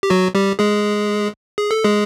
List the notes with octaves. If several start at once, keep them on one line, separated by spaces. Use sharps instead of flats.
G4
F#3 F#4
G3 G4
G#3 G#4
G#4
A4
G#3 G#4